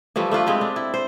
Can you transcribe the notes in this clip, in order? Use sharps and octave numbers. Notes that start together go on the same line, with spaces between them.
E3 F3 G3 A3
A3 D4 F4 B4
G#3 C4 E4 G4
D4
E4
C5